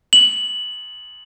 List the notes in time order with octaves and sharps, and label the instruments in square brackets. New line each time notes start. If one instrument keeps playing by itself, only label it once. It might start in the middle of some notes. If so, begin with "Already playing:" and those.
[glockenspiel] F#7